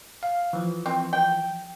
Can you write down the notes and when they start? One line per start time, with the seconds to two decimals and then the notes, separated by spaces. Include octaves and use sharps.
0.23 F5
0.53 E3 F3
0.86 C4
1.13 G5